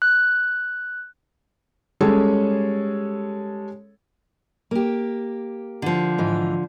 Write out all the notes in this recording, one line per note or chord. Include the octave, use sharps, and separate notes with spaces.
F#6
G3 G#3 C#4 G#4 A4 C#5
A#3 G4
D3 F3
G#2 E3